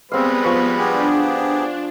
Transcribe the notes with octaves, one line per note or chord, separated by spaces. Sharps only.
G3 G#3 B3 C4 B4 F5
F3 C#6
B3 D4 G4 G#4